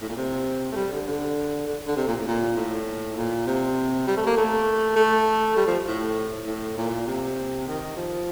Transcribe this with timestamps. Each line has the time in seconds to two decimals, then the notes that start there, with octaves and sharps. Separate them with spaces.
0.02 A2
0.09 A#2
0.17 C3
0.72 A3
0.76 G3
0.92 D3
1.07 D3
1.67 D3
1.87 D3
1.96 C3
2.07 A#2
2.17 A2
2.27 A#2
2.56 A2
3.16 A#2
3.47 C3
4.07 G3
4.17 A3
4.27 A#3
4.37 A3
4.96 A3
5.57 G3
5.67 F3
5.87 A2
6.47 A2
6.77 A#2
7.07 C3
7.67 D#3
7.97 F3